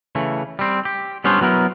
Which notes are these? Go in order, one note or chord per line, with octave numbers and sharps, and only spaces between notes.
C#3 E3 A3
G3 C4
G4
G3 B3 C#4 D4 C5
F#3 B3 E4 A#4